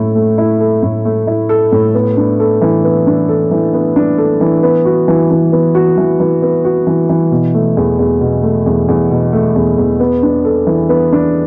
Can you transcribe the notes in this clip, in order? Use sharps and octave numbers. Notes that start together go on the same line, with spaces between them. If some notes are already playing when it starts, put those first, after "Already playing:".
Already playing: A2 E4 A4
A3
E4
A4
A2
A3
E4
A4
A2
B3
D4
A4
E3
B3
D4
A4
E3
B3
D4
A4
E3
B3
F#4
E3
E3
B3
F#4
E3
E3
B3
F#4
E3
E3
B2
A3
E2
E2
B2
A3
E2
E2
B2
A3
E2
E2
B3
D4
A4
E3
B3
D4